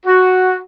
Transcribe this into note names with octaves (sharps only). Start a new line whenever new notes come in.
F#4